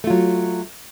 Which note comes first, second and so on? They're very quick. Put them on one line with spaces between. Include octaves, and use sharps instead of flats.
A3 F4 F#3